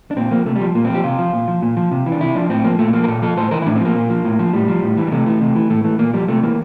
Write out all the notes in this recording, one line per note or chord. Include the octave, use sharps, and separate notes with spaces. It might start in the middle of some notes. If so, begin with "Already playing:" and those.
D4
A#2 C4
F3 A#3
C3 A3
F3 G3
A#2 A#3
C4
F3 G4
C3 F4
F3
A#2
F3
A#2
F3
C3
E3
D4
C3 E4
F3 D4
A2 C4
F3 A#3
A#2 A3
F3 A#3
A#4
A#2 A4
F3 A4
A2 C5
E3 A#4
E4
A2 D4
C4
F3 A#3
A#2
F3
A2
F3
A2 G3
F3
A2
E3
G3
C3 A3
E3
C3
E3
A2 A3
E3 A3
A#2 A#3
F3 G3
C3 A3
E3 A#3